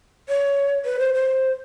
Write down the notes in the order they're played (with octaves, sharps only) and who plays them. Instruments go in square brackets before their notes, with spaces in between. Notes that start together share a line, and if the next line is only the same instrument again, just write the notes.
[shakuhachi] C#5
B4
C5
C5